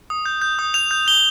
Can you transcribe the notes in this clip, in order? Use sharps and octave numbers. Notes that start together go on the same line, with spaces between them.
D#6
G6
G6
D#6
G6 F7
G6
G6 G7